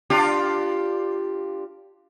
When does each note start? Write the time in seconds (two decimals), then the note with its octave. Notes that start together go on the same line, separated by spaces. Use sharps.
0.10 D4 F4 G4